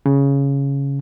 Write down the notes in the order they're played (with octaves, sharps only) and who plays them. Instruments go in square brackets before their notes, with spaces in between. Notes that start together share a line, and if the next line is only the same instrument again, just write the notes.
[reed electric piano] C#3